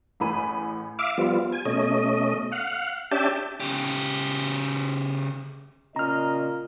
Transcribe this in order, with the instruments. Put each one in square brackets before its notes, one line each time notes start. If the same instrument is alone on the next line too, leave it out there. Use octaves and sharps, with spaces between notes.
[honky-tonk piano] A1 A2 G#4 B5 D#7
[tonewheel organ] E5 F5 D6
F3 G3 B3 F4
G#5
B2 A3 C#4 D#5
F5 F#5
C#4 D4 G4 E5 G5 A5
[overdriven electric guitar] C#3 G4
[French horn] A#2 [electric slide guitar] C#3 [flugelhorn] D#5 [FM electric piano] A#5 F6